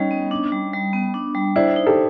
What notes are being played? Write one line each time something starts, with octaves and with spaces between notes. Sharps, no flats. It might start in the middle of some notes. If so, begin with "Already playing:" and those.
Already playing: G3 C#4 D#4
B3
D4
G3
G3
B3
D4
G3
D4 E4 C5
D#4
G4 A4